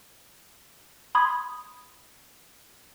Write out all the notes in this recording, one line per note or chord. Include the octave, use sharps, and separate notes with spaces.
B5 C6 D#6 G#6